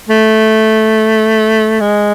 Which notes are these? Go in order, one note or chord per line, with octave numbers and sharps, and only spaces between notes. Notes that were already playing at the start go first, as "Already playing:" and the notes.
A3
G#3